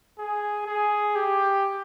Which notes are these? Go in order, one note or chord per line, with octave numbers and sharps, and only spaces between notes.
G#4
G#4
G4